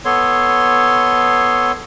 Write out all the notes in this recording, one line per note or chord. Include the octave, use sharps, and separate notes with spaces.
B3 A4 C#5 C6